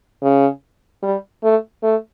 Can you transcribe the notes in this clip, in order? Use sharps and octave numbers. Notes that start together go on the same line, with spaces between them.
C#3
G3
A3
A3